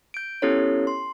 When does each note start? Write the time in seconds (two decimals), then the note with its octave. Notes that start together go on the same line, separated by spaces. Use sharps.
0.14 G6 D7
0.42 B3 C#4 E4 G4 A4 C#5
0.87 C6